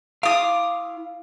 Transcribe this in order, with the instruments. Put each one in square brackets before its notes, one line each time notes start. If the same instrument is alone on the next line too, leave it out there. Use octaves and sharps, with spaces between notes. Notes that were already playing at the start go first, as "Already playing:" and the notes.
[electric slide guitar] E4 F5 [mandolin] D6 D#6